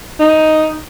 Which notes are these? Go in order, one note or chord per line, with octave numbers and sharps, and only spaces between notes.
D#4